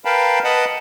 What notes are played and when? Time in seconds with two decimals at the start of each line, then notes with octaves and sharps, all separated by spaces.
0.05 A#4 B4 F5 G5 A5 B5
0.44 B4 D#5 F#5 A5 B5